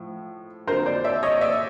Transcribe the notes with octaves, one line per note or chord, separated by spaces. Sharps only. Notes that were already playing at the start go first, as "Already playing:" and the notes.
Already playing: A2 F3
F2 D3 F#3 A#4 C5
C5 D5
D5 E5
C#5 D#5
D5 E5